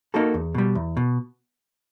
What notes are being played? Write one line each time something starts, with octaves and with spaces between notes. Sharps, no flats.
A#3 D#4 F#4 A4
E2
B2 G3
E2
B2